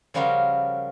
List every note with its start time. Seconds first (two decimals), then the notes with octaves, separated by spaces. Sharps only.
0.14 C#3 F3 G3 F4 F#4 A#4